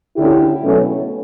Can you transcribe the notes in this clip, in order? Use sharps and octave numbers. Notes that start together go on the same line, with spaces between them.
D2 D3 A3 C#4 E4 G4
B2 F#3 A3 C#4